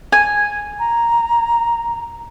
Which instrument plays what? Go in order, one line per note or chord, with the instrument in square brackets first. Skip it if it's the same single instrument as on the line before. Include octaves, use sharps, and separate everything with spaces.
[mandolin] G#5
[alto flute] A#5